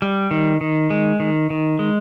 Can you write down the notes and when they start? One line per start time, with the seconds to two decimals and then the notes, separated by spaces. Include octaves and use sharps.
0.02 G3
0.31 D#3
0.61 D#3
0.90 G#3
1.20 D#3
1.50 D#3
1.79 G#3